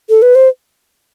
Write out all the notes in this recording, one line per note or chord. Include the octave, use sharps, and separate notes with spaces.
A4
B4
C5